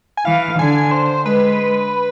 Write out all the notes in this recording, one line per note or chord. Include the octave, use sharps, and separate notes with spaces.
G#5
E3 F5
D3 G#5
C5
G#3 B4